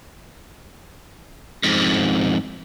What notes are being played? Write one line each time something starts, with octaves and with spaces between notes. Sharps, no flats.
F2 G#2